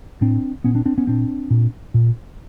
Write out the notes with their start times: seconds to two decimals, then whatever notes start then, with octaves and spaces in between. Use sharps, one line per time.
0.21 A2 C4 D4
0.64 A#2 B3 C#4
0.75 C4 D4
0.86 C4 D4
0.98 B3 C#4
1.07 A#2 C4 D4
1.50 A#2
1.94 A#2